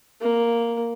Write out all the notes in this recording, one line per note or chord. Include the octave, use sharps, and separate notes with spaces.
A#3